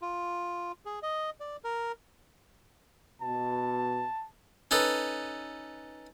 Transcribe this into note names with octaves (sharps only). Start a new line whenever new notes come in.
F4
G#4
D#5
D5
A#4
B2 A5
C#4 D#4 A4 B4